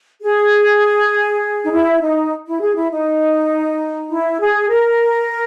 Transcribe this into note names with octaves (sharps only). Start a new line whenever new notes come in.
G#4
D#4
E4
D#4
E4
G#4
E4
D#4
E4
G#4
A#4